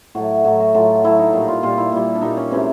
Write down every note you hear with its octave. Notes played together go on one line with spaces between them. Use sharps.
A2 F#3 A3 F#4
A2 F#3 A3 F#4
F#4
A2 F#3 A3 F4
A2 F#3 A3 E4
D#4
A#2 G3
F4
A#2 G3 F4
E4
A#2 G3
D4
A#2 G3 D#4
C#4
C3 E3 G#3 C#4